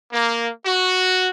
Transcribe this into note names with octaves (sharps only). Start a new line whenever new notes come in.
A#3
F#4